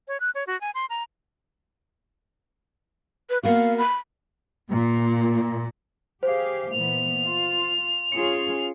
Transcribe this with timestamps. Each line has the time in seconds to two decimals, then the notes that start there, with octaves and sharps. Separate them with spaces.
0.08 C#5
0.20 F#6
0.35 C#5
0.47 F#4
0.61 G#5
0.75 C6
0.90 A#5
3.30 B4
3.43 A#3 B3 F#4 F5
3.78 B5
4.69 A#2
6.23 G4 G#4 C5 F5
6.72 A#2 E3 B3 F7
7.25 F4
8.12 C#4 F4 G#4 C#7